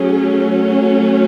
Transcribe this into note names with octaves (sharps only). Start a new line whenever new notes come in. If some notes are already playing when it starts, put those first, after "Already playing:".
Already playing: F#3 A3 C#4 G#4